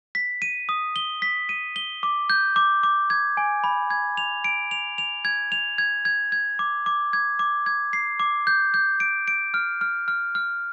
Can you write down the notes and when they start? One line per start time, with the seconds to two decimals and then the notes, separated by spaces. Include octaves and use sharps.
0.15 B6
0.42 D#7
0.69 D#6
0.96 G7
1.22 B6
1.49 D#7
1.76 G7
2.03 D6
2.30 G6
2.56 D6
2.83 D6
3.10 G#6
3.37 G#5
3.64 B5
3.90 G#6
4.17 F7
4.44 D7
4.71 F7
4.98 F7
5.25 G#6
5.52 F7
5.78 G#6
6.05 G#6
6.32 G#6
6.59 D6
6.86 D6
7.13 G#6
7.39 D6
7.66 G#6
7.93 C7
8.20 D6
8.47 G6
8.74 G6
9.00 D7
9.28 D7
9.54 F6
9.81 F6
10.08 F6
10.35 F6